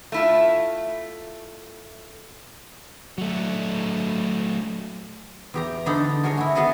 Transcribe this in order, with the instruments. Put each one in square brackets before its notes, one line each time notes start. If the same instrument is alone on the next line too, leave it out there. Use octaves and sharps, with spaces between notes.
[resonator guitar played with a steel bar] A3 E4 F4
[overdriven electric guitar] F#3 A3
[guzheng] E2 G4 A#5
D3 G3 D4 D#4 A4
F#4 G#4 A#4 C#5 G#5
E4 F#4
B3 F#4 G#4 A4 B4